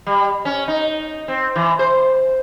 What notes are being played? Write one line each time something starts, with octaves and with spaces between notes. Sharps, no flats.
G3
C#4
D#4
C4
E3
C5